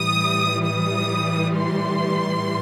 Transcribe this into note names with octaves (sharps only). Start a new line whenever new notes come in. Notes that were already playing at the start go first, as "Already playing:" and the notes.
Already playing: A2 E3 G3 D#6
D#6
C6